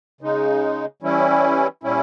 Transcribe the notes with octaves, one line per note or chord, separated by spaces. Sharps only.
C#3 G#3 D#4
E3 G3 C#4 E4
A#2 G3 C#4 E4